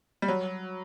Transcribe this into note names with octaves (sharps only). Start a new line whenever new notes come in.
G3
F#3